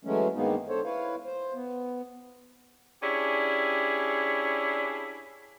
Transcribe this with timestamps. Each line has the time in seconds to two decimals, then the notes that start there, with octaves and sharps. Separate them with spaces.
0.05 E3 F#3 G#3 A3 C#4
0.35 G2 D#3 G#3 A#3 B3 D#4
0.69 D3 A4 C5 C#5
0.84 E4 B4 C#5 F5
1.25 C5
1.54 B3
3.03 C#4 D4 E4 G4 G#4